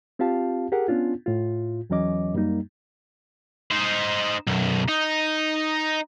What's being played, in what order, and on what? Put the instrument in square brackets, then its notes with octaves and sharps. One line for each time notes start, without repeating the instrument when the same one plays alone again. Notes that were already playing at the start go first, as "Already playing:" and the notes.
[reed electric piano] C4 F4 G4 F5 A5
G4 G#4 A#4 F#5
B3 C#4 D4 F4
A2 F4
E2 E3 F#3 C#4 D#5 D6
F#2 G3 A#3 D#4
[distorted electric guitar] D#4 C5
B1 F#2
D#4